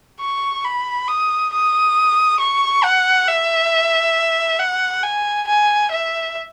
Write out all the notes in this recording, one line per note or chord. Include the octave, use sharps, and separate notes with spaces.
C#6
B5
D#6
D#6
C#6
F#5
E5
F#5
G#5
G#5
E5